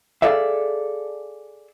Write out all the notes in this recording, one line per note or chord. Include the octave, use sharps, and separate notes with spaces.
G#4 A4 D5 E5 F5